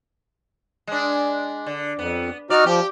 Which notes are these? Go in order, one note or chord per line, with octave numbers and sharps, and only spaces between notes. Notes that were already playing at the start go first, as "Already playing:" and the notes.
G#3 D4
D3
F2 B3
D#4 F#4 D5 F6
F3 G4